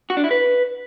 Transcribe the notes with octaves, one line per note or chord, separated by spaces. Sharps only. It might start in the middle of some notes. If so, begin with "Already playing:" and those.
F#4
D4
E4
B4